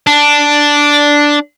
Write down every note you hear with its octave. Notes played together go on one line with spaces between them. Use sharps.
D4